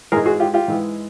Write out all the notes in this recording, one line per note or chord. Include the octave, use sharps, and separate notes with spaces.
G#2 E3 G#3 G#4 A#4
F#4 G#4
F4 G4
F4 G4
G#2 E3 G#3